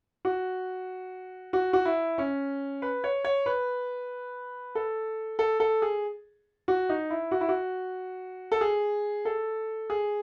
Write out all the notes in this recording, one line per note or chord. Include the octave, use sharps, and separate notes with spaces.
F#4
F#4
F#4
E4
C#4
B4
C#5
C#5
B4
A4
A4
A4
G#4
F#4
D#4
E4
F#4
E4
F#4
A4
G#4
A4
G#4